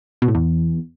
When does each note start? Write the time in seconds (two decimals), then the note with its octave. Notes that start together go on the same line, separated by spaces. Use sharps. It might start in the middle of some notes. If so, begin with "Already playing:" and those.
0.22 B2
0.28 A2
0.35 E2